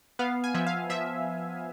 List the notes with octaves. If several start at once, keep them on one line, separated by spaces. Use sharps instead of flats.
B3 F5
G#5
F3 E5
F5
F3 E5